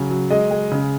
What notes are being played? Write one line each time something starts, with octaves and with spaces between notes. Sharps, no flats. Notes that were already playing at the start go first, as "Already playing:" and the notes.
Already playing: C#3 F#3
F#3
G#3 D#5
G#3
C#3